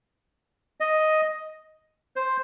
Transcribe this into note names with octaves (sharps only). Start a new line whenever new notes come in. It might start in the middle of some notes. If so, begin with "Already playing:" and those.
D#5
C5